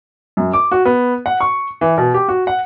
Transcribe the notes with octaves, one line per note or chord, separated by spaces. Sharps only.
F#2
D6
F#4
B3
F#5
C#6
E3
B2
G4
F#4
F#5